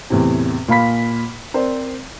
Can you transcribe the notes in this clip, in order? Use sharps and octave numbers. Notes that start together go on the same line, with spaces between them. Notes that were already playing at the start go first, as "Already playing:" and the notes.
E2 A2 C3
A#2 F5 B5 B6
C4 A#4 C5 D5